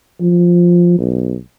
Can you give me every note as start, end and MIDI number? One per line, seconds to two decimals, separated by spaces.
0.21 0.95 53
0.99 1.36 35